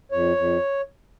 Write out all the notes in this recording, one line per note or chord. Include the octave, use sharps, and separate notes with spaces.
F2 C#5
F2